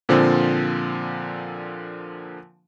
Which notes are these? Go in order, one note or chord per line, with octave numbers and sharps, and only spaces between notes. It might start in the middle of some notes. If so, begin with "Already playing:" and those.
A#2 D3 F3 C4